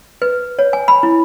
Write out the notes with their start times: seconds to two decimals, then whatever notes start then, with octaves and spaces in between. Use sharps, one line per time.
0.22 B4
0.59 C#5
0.73 G#5
0.88 B5
1.03 E4